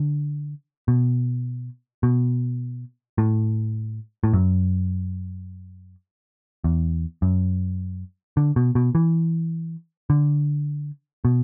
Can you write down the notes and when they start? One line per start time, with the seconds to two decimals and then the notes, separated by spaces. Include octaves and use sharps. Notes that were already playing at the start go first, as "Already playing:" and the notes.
Already playing: D3
0.88 B2
2.03 B2
3.18 A2
4.23 A2
4.33 F#2
6.64 E2
7.22 F#2
8.37 D3
8.56 B2
8.75 B2
8.95 E3
10.10 D3
11.25 B2